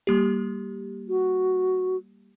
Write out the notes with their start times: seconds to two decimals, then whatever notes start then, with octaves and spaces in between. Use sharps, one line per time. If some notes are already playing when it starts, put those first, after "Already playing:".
0.07 G3 A#3 G4
1.09 F#4